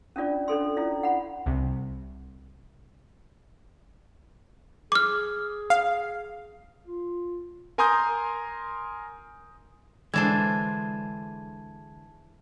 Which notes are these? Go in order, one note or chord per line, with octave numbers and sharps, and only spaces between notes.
C#4 D4 F4 D5
C#4 D4 A4 C6
C#4 E4 F4 D5
F#5 B5
C2 C3
G#4 D6 F6
F5
F4
A#4 G#5 A#5 C6 D#6 G6
D3 E3 G#3 D4 C5 A5 G#6